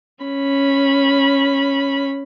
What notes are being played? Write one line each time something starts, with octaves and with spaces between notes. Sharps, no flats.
C#4 B5